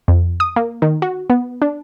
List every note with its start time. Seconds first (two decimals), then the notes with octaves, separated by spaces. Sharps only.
0.08 F2
0.40 D#6
0.56 A#3
0.82 D#3
1.02 F#4
1.30 B3
1.62 D4